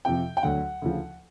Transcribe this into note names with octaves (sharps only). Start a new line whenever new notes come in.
F2 C3 F3 G5
G5
D2 D3 F#3 F#5
D2 C#3 F3